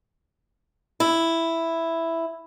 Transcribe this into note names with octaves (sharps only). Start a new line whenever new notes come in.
E4